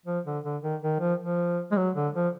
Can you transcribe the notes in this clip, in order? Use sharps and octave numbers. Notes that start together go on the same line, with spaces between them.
F3
D3
D3
D#3
D#3
F3
F3
G#3
F#3
D3
F3